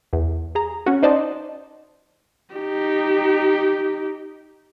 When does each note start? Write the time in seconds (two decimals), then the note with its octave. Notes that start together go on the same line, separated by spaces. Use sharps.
0.13 E2
0.55 G#4 A#5
0.86 C#4 F#4
1.03 D#4 C5 D5 D#5 A5
2.54 D#4 G4